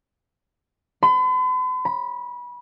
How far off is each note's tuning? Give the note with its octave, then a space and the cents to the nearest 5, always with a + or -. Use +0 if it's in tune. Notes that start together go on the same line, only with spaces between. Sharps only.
B5 +45
B5 -25